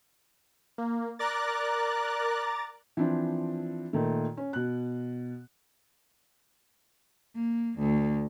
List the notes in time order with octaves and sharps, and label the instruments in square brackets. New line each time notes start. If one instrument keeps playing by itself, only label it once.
[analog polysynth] A#3
[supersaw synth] A#4 D5 F#6 [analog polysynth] A#5 D6 A6
[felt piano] E3 F3 C4 D4
A#2 D#3 A3
C#4
B2 F#6
[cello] A#3
D2